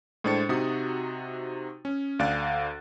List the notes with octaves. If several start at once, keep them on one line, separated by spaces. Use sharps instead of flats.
A2 G#3 D4 C5 A6 C#7
C3 D#4 F#4 D#6
C#4
D2 D5 F5 F#6 A6